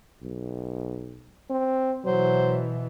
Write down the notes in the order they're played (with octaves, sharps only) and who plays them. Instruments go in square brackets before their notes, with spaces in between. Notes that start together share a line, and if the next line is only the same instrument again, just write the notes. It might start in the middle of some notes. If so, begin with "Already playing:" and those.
[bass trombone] B1
C4
[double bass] B2 E3 [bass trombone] F#3 [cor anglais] C5